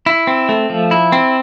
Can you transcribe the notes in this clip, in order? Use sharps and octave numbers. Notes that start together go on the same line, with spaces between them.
E4
C4
A3
F3
E4
C4